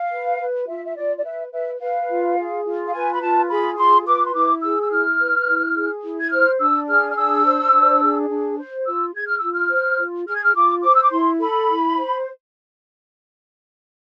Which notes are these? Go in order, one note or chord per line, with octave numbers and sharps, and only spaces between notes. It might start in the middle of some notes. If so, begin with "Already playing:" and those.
Already playing: F5
B4
B4
F4 E5
E5
F4 D5
D5
B4 E5
B4 E5
B4 F5
F4
G#4
F4
F5
B4 G#5
B5
F4 A5
G#4 B5
F4 C6
B4 D6
C6
E4 D6
G#4 E6
E6
E4 F6
B4
E4
G#4
E4
G#6
C5 F6
D4 E6
G#4 F6
F6
D4 E6
C5
D4
G#4
D4
C5
F4 E6
G#4 G#6
F6
F4 E6
F6
C5
F4
G#4 F6
G#6
F6
F4 D6
C5 D6
E6
D6
E4 C6
A4 B5
E4
C5